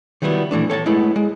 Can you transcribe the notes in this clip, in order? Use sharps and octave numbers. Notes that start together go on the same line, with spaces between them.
D#3 F#3 G3 B3 E4
A#2 E3 A3 D4
A4 C#5 G5 A5
G#3 A3 B3 E4
G#3